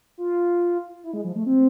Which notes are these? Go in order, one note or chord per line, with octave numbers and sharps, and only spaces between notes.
F4
E4
G#3
F3
A3
C4